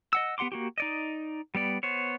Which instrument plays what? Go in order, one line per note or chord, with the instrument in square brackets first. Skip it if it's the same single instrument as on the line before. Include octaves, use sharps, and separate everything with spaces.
[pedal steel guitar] D#5 F#5 E6
B3 G4 F#5 C6 D6
A#3 F#4 G4
D#4 D5 D#5
G3 B3 D5
B3 C5 C#5